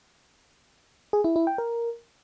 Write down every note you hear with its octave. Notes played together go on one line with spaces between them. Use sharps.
G#4
E4
E4
G5
A#4